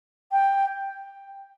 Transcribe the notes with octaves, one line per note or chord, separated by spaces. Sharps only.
G5